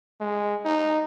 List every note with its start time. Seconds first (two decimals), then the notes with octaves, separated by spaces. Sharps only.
0.21 G#3
0.65 D#4